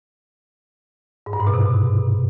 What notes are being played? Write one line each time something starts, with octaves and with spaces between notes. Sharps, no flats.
G#2
G2
G#2
B2
C3